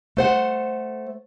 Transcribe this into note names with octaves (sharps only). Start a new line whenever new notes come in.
A3 C5 F#5